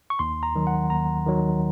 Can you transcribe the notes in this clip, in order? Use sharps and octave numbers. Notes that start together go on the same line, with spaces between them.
C#6
D#2 C6
A#5
D#3 F#3
F#5
D#2 A#5
D#3 F#3